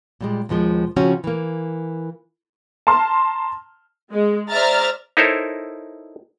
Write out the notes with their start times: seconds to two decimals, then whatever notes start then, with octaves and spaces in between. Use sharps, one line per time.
0.21 A#2 G3 G#3
0.49 D#2 B2 F3 G#3
0.96 C#3 F3 C4 C#4 F#4
1.24 E3 A#3
2.87 A5 A#5 C6 F6
4.12 G#3
4.51 C5 D5 E5 A#5 F6 A6
5.17 D#4 E4 A4 A#4 C5 C#5